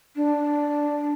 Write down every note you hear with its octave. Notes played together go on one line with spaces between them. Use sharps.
D4